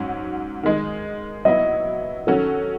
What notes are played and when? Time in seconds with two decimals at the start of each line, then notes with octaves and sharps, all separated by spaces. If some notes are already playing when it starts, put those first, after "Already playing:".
Already playing: G#2 F#3 C#4
0.63 D#3 G#3 D#4
1.45 F#3 B3 E4 D#5
2.27 D#3 F#3 C#4 F#4 A4